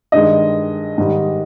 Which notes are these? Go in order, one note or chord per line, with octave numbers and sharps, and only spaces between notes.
G2 D#3 G#3 D#5
G#2 D#3 G3